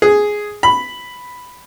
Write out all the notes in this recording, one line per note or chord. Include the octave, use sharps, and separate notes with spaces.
G#4
B5